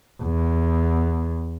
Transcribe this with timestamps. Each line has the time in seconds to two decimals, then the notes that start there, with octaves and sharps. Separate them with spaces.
0.23 E2